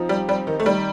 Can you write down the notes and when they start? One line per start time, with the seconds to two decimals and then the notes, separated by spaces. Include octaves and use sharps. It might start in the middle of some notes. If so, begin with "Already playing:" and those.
Already playing: F3 C4 D#4
0.09 G3 G4
0.28 G3 C4
0.47 D#3 D#4
0.60 A3
0.66 D#3 G3